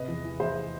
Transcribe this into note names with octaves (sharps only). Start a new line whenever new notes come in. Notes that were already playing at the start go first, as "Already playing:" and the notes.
Already playing: C3 B4 D#5
E2
E3
E2 C5 E5